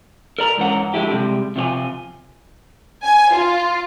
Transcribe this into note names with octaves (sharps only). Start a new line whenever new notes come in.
A#4 D5 A#5
G#2 E3 C#4 A#4 F#5 A#5
D3 F3 G#3 A3 E4 G4
C3 G3 G#3
C3 F3 C#5 G#5
G#5
F4